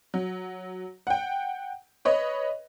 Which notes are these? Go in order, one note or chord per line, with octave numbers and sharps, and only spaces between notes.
F#3
F#5 G5
B4 C#5 D#5